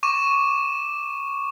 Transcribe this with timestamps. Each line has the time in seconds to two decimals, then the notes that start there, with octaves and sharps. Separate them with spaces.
0.03 C#6 D6 D#7 E7